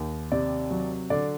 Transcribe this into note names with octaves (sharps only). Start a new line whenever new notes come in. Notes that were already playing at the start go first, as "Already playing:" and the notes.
Already playing: D#2 D#3
C3 D5
F#3
D3 D5